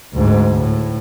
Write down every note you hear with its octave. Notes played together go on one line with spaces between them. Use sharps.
D2 G#2
A2